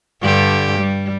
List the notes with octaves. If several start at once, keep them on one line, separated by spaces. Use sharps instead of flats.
G2 D3 G4
G3